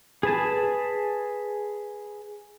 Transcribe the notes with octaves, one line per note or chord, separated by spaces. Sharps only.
G#4 B4 A5